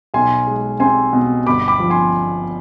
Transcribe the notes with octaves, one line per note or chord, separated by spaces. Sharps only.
B1 G#5 C6
G#3
C4 G#5 C6
B2
G1 B5 D6
B5 D6
F3
G#5 C6